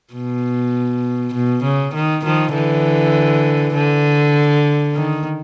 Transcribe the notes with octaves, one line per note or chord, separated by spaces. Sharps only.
B2
B2
C#3
D#3
D#3 F3
D3 E3
D3
D#3